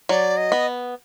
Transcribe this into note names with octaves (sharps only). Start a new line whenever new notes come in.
F#3 D5
D#5
B3